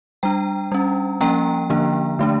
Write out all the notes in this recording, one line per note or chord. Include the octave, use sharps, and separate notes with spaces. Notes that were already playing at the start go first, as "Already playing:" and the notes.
G3 D4 G5 A#5
G3 C#4
F3 A#3 C#4 G5 A#5
D3 F3 A#3 D4
D3 A3 D4